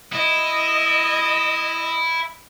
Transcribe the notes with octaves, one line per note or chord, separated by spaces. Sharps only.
E4 D#5